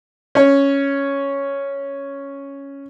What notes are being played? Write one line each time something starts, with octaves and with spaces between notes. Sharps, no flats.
C#4 C#5